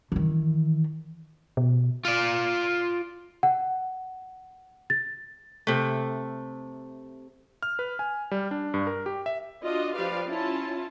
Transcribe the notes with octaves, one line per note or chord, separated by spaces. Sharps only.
D#3 E3
B2
F4 D5
F#5
A6
C3 A3
F6
B4
G#5
G3
D4
G2
A#4
G4
E5
D4 F4 F#4 D#5
F3 G4 B4 D5 F5
C#4 E4 F4 A5